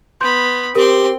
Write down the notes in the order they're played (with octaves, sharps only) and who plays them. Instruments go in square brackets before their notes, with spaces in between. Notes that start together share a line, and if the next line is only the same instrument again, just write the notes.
[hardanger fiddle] B3 B5 [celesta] C6 G6
[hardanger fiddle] C4 C6 [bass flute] G4 [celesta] A#4